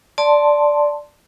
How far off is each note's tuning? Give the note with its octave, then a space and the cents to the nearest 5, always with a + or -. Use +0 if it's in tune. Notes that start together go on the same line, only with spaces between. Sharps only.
D5 +0 A5 +0 C6 +0